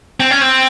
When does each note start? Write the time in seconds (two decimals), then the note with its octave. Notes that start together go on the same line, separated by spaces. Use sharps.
0.20 C4
0.31 C#4
0.41 C4